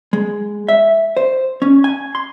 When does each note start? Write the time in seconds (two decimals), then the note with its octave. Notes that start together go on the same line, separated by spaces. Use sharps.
0.13 G#3
0.68 E5
1.17 C5
1.62 C#4
1.84 G#5
2.15 C6